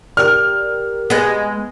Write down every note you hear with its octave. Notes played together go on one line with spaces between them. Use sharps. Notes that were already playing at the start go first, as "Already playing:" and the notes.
G4 A#4 D5 F6
G#3 B3